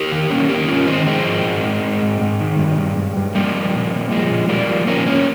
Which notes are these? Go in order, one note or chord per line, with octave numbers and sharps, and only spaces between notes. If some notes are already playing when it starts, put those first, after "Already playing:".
Already playing: G4 A#4
D#3
D#3 A#3 C#4
D#3 G4 A#4
G2 C#4 F4
D#3 C4 D#4
F3 G#3 C4
G#2
G#2
G#2
G#2
G#2
G#2
D#3
G2
G2
G2
G2
F3 G3 A#3
F3
A#2
A#2
F3 G#3
A#2
A#2 G3 A#3
F3
F3 A#3 C#4
G#2 A#3 C#4